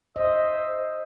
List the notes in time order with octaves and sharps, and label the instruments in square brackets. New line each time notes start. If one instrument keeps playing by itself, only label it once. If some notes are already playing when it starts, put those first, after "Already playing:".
[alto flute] C5 [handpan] D#5 [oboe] E5